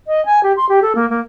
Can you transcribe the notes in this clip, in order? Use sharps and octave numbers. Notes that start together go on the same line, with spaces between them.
D#5
G#5
G4
C6
G4
A4
A#3
A#3